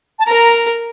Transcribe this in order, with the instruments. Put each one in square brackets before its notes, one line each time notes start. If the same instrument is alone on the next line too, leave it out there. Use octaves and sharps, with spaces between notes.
[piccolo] A5
[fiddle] A#4 [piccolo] A#5